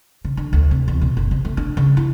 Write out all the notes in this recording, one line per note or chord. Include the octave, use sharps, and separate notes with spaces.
C#3
D3
D2
C3
E2
B2
F#1
C3
A3
D4
C#3
E4